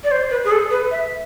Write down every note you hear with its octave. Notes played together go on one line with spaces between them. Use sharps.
D5
C5
B4
G#4
A4
B4
E5